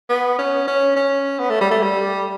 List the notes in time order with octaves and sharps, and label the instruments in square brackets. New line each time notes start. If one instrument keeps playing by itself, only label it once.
[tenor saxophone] B3
C#4
C#4
C#4
B3
A3
G3
A3
G3